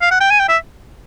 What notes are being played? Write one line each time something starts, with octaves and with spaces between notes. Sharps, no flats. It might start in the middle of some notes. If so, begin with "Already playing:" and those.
F5
F#5
G5
G#5
G5
E5